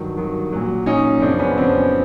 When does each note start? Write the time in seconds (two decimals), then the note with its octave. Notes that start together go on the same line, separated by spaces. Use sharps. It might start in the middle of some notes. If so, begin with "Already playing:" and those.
Already playing: G2 D#3 F#3
0.17 G2 D#3 F#3
0.52 A#2 F#3
0.86 A#2 F#3 C#4 D#4
1.22 F#2 C#3 F3 C4 D4
1.39 B3 C#4
1.57 F#2 C#3 F3 C4